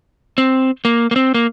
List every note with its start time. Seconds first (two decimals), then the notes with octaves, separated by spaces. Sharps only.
0.38 C4
0.85 A#3
1.11 A#3
1.16 C4
1.34 A#3